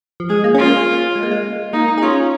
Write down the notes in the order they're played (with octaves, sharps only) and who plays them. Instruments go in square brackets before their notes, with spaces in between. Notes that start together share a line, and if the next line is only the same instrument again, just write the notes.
[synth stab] F3
[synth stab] G#3 [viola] G#4
[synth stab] A#3
C#4
[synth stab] A#3 [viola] F4
[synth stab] G#3
A#3
G#3
[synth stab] A#3 [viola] D#4
[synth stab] D#4
G#4
[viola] C#4 [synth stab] F4